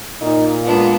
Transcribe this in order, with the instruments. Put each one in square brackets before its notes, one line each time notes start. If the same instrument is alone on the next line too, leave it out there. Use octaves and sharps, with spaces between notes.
[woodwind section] A#2 [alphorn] D#4
[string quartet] G#3 B3 D4 [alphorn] F4